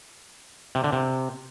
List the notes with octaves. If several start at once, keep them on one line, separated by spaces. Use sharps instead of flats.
C3
D3
C3